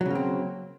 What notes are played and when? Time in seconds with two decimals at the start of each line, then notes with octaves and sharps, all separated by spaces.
0.01 F#3
0.06 C#3
0.10 A#3
0.15 C4